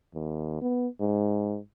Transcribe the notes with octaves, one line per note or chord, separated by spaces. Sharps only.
D#2
B3
G#2